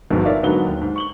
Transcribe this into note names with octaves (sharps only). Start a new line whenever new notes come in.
G1 F2 G#2 B2
D#3 F4 A#4 C#5 D5 E5
G#2 D3 F#3 A#3 B3 G7
D#2
G#2
C#6 F#7 G7